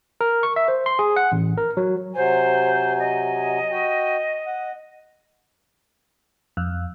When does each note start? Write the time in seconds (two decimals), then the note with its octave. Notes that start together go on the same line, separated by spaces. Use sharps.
0.21 A#4
0.43 C#6
0.56 E5
0.68 C5
0.86 C6
0.99 G#4
1.16 F#5
1.32 A1
1.57 A#4
1.77 F#3
2.15 C3 F#3 C5 G#5
2.99 D#5
3.71 F#4 G5
4.46 F#5
6.57 F2